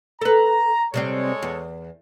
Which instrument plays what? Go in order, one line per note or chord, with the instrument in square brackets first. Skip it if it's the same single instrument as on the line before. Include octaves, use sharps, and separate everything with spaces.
[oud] A4 B4 [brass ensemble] A#5
[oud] C3 G3 C4 [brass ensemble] G#3 A4 C#5
[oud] E2